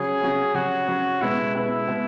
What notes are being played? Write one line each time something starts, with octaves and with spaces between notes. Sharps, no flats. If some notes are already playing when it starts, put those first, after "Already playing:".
Already playing: C#3 F#3 C#4 G#4
C#3 F#3 C#4
C#3 F#3 C#4 F#4
C#3 F#3 C#4
B2 G#3 B3 E4
B2 G#3 B3 E4
B2 G#3 B3